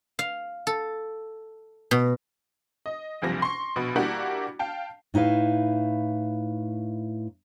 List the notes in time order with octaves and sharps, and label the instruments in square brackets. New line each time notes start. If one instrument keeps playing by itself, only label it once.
[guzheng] F5
A4
B2
[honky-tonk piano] D#5
F#1 D2 C3 F3 G3 A#6
C6 C#6
A#1 B2 B5
G3 A#3 D4 E4 F#4 G4
F5 G5 A5
[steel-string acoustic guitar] A2 D#4 E4 B4 F5